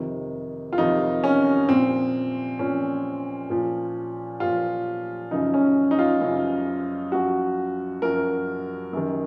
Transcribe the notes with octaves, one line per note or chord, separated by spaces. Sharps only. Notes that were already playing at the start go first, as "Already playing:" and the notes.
Already playing: F2 C3 D#3
F4
F2 C3 D#3 D#4
C#4
A#2 F3 C4
A#2 F3 C#4
A#2 F3
A#2 F3 F4
F#2 C#3 F3 D#4
C#4
D#4
F4
F#2 C#3 F3
F#2 F3 F#4
F#2 F3 A#4
F#2 D#3